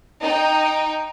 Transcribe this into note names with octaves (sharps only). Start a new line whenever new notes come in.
D#4 G5